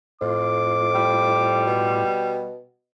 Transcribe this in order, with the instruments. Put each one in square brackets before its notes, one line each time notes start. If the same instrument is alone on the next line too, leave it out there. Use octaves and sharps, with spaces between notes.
[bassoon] F2 [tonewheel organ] A2 F4 [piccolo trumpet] D6
[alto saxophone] G3
[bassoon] B2